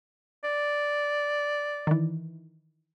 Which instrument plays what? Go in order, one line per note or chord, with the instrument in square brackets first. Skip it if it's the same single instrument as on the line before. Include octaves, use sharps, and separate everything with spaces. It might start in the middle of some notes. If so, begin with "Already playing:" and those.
[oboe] D5
[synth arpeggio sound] D#3 E3